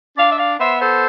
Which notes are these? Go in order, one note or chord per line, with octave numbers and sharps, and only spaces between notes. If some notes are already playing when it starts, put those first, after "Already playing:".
D4 D5 F5
E5
D5 F5
B3 C5 E5
A4 C5